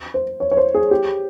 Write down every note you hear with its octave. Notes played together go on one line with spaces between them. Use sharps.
C5
C#5
C#5
C5
G#4
G4